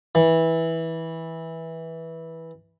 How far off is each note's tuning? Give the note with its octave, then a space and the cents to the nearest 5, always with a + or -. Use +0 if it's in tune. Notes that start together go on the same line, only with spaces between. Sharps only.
E3 -15